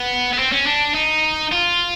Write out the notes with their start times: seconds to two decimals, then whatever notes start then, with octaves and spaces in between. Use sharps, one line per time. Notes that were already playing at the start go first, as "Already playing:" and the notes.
Already playing: B3
0.33 B3
0.38 C4
0.52 C#4
0.67 D4
0.95 D#4
1.52 F4